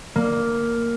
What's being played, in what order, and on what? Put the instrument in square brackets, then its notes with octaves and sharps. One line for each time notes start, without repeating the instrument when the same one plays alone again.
[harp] A#3